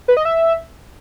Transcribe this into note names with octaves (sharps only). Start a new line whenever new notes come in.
B4
D#5
E5